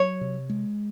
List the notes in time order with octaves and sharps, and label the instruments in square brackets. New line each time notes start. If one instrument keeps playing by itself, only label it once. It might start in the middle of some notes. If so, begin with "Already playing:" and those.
Already playing: [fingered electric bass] F#3 [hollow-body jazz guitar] C#5
[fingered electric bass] C3
G#3